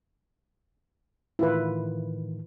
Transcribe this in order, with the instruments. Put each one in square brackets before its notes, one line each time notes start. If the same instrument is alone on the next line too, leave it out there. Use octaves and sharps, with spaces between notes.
[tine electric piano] A2 D#3 E3 [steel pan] E4 F4 B4